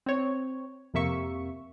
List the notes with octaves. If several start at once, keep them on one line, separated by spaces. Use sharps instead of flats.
C4 C#5
F2 C3 A#3 E5 C#6